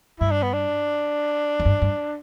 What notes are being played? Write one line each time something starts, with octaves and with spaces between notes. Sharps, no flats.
G2 E4
D4
B3
D4
E2
G2
G2